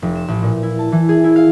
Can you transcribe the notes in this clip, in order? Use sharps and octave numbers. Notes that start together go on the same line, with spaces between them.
F1
E7
A1
A#2
E4
A5
E3
G#4
E4
F5